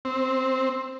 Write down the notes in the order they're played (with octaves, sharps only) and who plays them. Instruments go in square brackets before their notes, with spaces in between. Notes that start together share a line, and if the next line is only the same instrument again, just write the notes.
[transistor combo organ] C4